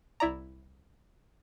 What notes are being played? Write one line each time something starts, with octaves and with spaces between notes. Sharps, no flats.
C2 E4 D5 A#5